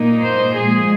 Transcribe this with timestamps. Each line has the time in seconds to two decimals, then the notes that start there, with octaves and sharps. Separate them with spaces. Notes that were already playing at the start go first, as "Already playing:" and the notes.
Already playing: A#2 A#3 D#4
0.23 C5
0.56 A#2 F3 G#3 G#4